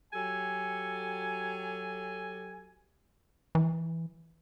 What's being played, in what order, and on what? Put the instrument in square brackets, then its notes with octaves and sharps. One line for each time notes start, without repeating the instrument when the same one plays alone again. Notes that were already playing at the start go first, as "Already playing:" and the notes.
[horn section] F#3 G4 A4 G#5
[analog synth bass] E3